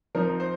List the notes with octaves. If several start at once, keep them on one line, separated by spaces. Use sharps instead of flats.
F3 C4 D#4 A#4
C5